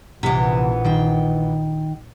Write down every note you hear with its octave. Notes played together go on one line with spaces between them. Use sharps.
A#1 E2 C3 E3 B3
D#3 G5